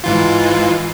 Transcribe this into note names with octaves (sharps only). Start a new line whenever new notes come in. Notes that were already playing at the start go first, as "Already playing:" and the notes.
G#2 E3 F4